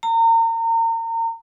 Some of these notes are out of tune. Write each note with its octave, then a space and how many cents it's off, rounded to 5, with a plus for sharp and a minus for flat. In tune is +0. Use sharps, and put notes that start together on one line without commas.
A#5 -35